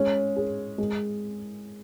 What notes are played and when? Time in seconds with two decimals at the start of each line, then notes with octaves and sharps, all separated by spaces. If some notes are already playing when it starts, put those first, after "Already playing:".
Already playing: G#3 C#4
0.36 G#4
0.78 G#3